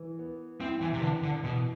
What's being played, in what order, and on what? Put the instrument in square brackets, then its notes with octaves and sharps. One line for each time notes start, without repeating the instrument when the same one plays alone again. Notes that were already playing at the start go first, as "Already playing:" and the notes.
Already playing: [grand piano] E3
B3
[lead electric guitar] C4 [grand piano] E4
[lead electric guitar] E3
C3
[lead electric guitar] D3 [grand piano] E3
[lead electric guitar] D3
[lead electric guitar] B2 [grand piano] E3